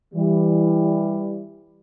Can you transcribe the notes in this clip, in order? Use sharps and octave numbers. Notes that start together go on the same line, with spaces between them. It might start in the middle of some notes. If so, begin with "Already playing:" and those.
E3 G3